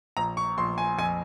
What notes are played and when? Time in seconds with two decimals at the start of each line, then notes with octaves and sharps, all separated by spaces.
0.17 A#1 A#5
0.37 C#6
0.58 A#1 C6
0.78 G#5
0.98 F2 G#5